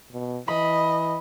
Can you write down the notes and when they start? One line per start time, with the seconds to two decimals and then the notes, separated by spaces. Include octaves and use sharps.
0.12 B2
0.48 E3 D#5 B5